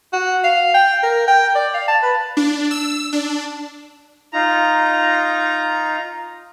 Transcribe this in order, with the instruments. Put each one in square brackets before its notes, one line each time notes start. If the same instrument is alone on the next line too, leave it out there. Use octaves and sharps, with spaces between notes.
[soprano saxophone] F#4
F5
G5
A#4
G5
D5
F5
A5
B4
[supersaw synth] D4
E6
D4
[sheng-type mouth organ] D#4 F4 A#5